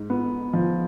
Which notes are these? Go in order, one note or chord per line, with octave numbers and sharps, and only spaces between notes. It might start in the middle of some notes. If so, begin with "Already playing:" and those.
Already playing: G#2
B3
F3